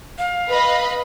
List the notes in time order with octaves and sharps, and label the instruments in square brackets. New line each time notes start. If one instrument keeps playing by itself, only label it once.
[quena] F5
[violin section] B4 D#5 B5